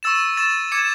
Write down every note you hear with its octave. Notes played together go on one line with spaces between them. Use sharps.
C#6 E6 A6 E7
C#6 E6 A6 E7
D6 G#6 C#7 E7